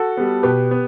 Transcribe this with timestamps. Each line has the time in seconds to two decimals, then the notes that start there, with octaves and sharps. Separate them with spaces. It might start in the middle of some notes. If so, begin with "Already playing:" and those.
Already playing: F#4 A4
0.17 G3 B3
0.43 B2 G4 B4
0.71 B3